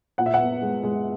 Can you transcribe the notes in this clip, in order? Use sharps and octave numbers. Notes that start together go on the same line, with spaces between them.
A#2 F#5
E5
F#5
B3
G#3
G#3